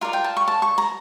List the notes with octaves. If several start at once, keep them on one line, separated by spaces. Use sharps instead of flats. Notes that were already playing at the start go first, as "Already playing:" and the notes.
F4 A#4 D5
G5
A5
C#6
A5
C#6
A#5